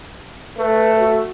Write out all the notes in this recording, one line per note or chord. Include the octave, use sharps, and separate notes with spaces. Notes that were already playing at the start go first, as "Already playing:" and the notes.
A3 B4
F#4